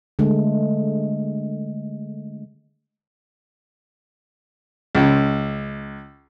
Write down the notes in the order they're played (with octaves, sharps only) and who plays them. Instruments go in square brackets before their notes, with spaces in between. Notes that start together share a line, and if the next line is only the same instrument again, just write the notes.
[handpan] D3 G#3 A3
[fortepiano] C#2